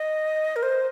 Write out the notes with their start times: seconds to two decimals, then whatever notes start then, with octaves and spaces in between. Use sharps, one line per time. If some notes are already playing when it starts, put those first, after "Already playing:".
Already playing: D#5
0.56 A#4
0.63 C5